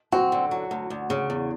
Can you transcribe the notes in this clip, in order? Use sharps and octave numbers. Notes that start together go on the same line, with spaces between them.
C4 F#4
D3
F#3
D2
D2
C#3
E2